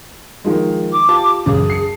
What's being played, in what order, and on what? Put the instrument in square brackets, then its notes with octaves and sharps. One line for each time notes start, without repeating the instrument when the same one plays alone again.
[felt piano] D#3 F3 G#3
[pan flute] D6
[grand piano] F4 G4 [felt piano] A5
[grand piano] E1 C#2 F#2 [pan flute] G#4
[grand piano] C7 C#7